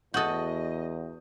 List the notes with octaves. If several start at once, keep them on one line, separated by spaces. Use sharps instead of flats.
E2 F#4 A4 D#5 D#6 G6